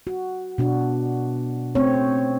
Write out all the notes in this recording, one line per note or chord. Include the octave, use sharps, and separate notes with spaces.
F#4
B2 D4 F#4
A3 C4 C#4 C#5